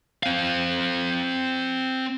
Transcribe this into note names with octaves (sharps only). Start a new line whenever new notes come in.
C4 F5